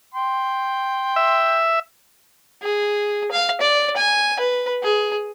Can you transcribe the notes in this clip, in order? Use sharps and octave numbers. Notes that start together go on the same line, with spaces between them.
G5 C6
E5
G#4
F5
D5
G#5
B4
G#4